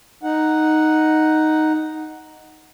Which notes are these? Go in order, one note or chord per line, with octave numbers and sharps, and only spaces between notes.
D#4 F#5